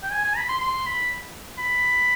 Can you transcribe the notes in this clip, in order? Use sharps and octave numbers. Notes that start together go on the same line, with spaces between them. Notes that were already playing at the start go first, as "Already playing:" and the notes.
G5
G#5
G#5
B5
C6
C6
B5
B5